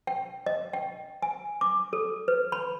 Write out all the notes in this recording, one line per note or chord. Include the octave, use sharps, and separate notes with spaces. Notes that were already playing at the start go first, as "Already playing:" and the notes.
G5
D#5
G5
G#5
D6
A4
B4
B5